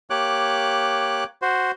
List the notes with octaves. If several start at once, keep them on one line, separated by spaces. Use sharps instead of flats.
A#3 G4 C#5 D6 F#6
F#4 C5